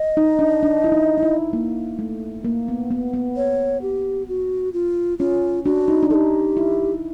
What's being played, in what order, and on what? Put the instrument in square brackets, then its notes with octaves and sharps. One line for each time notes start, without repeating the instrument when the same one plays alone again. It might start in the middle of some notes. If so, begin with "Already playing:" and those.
Already playing: [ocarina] D#5
[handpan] D#4
D4
D4
E4
D#4
D#4
E4
A#3
A3
A#3
B3
B3
B3
[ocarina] C#5
G4
F#4
F4
[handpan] C#4 [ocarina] F4
[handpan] D4 [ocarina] F#4
[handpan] D#4
D4
[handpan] D#4 [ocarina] G4 A4
[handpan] E4